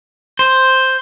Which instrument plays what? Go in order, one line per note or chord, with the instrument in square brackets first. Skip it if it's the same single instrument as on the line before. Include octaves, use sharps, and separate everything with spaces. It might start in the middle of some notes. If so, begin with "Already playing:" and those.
[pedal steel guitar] C5